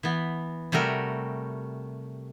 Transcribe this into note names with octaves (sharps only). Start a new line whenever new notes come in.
E3 B3
C3 G3 A3 F#4 A#4